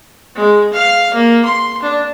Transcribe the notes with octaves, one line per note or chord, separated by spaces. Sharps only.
G#3
F5
A#3
C6
D4